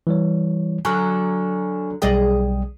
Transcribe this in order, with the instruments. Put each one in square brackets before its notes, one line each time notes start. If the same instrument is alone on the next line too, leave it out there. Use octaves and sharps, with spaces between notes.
[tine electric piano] E3 G3 C#5
[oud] D3 F#3 [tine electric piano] G#5 C#6 F6
[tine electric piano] B1 G3 G5 [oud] G#4 D5 D#5